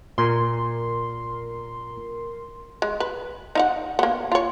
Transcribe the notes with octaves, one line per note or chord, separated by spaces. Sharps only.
A#2 A#4 C6
G#3
B4
D#4 F5 F#5
A#3 B3
F4 C#5